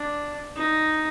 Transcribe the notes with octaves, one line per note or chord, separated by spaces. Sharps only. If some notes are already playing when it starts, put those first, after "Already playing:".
Already playing: D4
D#4